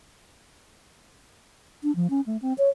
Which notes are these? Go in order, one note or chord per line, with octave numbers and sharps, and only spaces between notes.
D4
F3
C#4
A3
C4
C#5